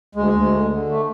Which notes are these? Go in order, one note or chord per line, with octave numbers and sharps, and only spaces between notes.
D2 G#3
D2
D3
D3
A3